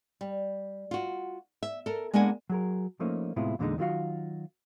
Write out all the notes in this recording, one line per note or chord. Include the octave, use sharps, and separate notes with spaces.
G3
F4 F#4
E5
A4 A#4
G#3 A#3 B3 D4 F#5 G#5
F#3 G#4 A#4
F3 A3 A#3 C#4 D#4
A2 C3 G#3 B3 E4 F4
E2 A#2 D3 G3 G#3 D#4
D#3 F#3 A3 F4 F#4 F5